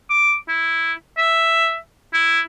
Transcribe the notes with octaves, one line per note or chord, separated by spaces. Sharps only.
D6
E4
E5
E4